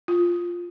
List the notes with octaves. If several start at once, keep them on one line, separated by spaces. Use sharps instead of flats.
F4